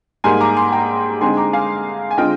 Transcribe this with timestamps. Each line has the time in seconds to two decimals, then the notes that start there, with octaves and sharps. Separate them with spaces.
0.24 G#2 G3 A#3 D#4 G#5 C6
0.41 A#5 D6
0.57 G#5 C6
0.72 G5 A#5
1.21 D3 G#3 C4 D#4 G#5 C6
1.37 A#5 D6
1.53 F5 G#5
2.11 G#5
2.17 D3 G#3 C4 F4 D#5 G5